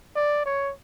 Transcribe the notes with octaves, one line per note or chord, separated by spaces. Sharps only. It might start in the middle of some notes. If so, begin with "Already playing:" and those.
D5
C#5